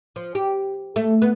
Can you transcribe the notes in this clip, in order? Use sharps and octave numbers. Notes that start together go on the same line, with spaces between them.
F3
G4
A3
B3